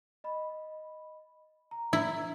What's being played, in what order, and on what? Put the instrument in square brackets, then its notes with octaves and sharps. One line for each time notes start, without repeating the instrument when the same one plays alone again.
[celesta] D#5 B5
A#5
[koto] E4